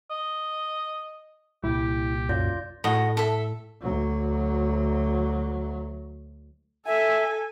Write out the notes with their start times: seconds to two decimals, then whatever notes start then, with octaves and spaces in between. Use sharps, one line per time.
0.11 D#5
1.64 C2 A#2 G3 E4 G4
2.29 F#2 F4 D5 G6
2.84 A2 F#4 D#5
3.17 A4 E5
3.82 D2 F#3
6.86 A4 E5 G#5